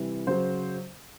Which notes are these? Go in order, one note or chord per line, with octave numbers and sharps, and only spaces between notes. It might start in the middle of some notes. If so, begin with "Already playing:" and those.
Already playing: C3 E3 G3
C#3 F#3 C5